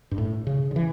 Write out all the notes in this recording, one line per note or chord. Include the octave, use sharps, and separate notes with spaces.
G2
A2
C#3
D3
E3